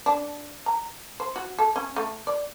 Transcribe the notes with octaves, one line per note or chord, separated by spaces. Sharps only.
D4
A#5
C5
F#4
A4
C#4
A3
D5